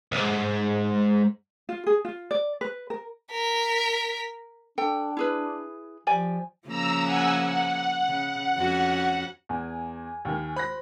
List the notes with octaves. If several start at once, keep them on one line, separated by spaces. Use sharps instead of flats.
B1 G#2
F4
G#4
F4
D5
B4
A#4
A#4 B6
D4 A4 G5
E4 G#4 B4
F3 G4 D5 G#5
C#3 F3 A#3 A#5 E6
F#5 G#5 E6
F#5
C#3
F2 C#4 F#4
E2 G#5
D#2 D#3
C5 B5 F#6 A#6